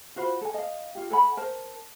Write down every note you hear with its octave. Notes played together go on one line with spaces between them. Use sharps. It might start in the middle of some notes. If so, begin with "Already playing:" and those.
F4 F#4 C5 B5
A4 G#5
D#5 F5
F4 G4
A4 F#5 G#5 B5
A#4 C5 A5